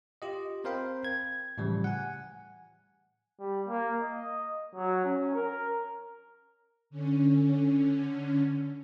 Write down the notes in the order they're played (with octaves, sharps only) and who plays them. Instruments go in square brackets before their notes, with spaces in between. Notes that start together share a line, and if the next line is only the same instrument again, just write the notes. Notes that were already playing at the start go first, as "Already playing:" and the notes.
[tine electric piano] F4 G4 D#5
C4 A#4 C5 F5 G5 B5
G#6
A2 C#3 E3 F3 G3
F#5 G#5
[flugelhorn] G3
A#3
D#5
F#3
C#4
A#4
[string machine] D3 C#4